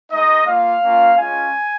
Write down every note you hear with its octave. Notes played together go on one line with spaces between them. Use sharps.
G#3 D#4 D#5
A#3 F4 F5
A#3 C#4 F4
G#3 C#4 F4 G#5